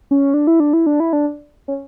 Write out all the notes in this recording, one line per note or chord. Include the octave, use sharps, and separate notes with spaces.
C#4
D4
E4
D4
E4
D4
E4
D4
C#4